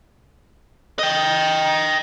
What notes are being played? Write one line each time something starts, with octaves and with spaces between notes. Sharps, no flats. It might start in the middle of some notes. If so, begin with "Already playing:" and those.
D#5 G5